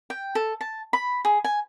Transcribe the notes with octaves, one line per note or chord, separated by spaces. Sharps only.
G5
A4
A5
B5
G#4
G#5